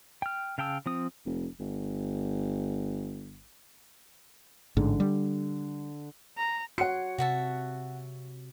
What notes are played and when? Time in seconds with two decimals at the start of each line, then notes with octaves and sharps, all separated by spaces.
0.22 G5 F6
0.58 C#3 F5 G5 A5 E6
0.86 F3 C4 D#6
1.26 F1
1.60 G1
4.77 A1 G#2 D3
5.00 G3
6.37 A#5
6.78 F#4 C#5 F#5 C6 C#7
7.18 C3 F#4 E5 A5